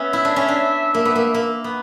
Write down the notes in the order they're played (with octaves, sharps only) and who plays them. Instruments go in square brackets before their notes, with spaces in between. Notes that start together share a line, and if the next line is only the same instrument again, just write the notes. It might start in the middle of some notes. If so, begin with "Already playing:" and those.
Already playing: [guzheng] B3 C#4 [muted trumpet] E5
[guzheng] E4
D4
C#4
D4
A#3
B3
A#3
A#3
B3